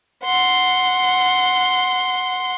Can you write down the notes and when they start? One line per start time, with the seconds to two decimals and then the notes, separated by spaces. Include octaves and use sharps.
0.24 F#5 C6